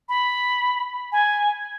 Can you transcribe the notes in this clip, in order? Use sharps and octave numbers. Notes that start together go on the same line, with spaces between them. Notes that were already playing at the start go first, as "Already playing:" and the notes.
B5
G#5